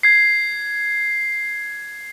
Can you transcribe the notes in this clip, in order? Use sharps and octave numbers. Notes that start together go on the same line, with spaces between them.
G#6 C7